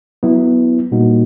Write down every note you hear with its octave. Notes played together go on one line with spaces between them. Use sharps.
F#3 B3 E4
A#2 G3 A#3 D#4 F#4